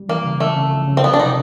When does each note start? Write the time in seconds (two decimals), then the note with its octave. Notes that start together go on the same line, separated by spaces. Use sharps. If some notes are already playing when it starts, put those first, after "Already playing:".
Already playing: G3
0.09 E3 A#3
0.24 C#3
0.40 E3 A3
0.56 C#3
0.72 F3
0.88 C#3
0.97 C4
1.04 F3 B3
1.14 D4
1.19 C3 D#4